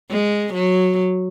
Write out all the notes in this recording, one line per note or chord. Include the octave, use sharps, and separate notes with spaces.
G#3
F#3